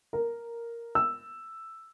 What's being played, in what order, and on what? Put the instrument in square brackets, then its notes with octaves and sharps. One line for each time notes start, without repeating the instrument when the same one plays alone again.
[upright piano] A#4
E6